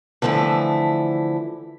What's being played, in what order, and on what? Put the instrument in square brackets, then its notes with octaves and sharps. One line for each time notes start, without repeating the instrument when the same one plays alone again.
[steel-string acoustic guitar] D3 E3 F3 A3 E4